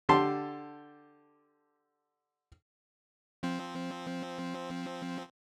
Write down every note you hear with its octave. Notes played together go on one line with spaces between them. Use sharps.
D3 G4 A5 C6
F3 C4